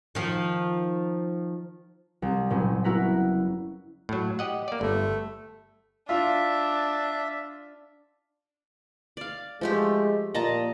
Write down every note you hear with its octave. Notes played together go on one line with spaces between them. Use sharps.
D#3 F3
C2
F#1 A#2 C#4 C5
B3 E4 F#4 A#4 F#6 B6
A2 F#3
G4 D#5 F#5
A#3 D5
G1 A3
D4 F4 E5
D5 F5
F3 G#3 A3 G4
A#2 D#5 A5 A#5